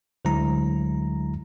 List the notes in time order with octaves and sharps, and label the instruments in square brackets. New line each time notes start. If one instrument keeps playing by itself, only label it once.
[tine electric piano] D2 D3 F#3 G#3 E4 A#5